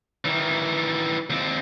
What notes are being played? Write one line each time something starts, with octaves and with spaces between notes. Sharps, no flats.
D#3 E3
D#2 C4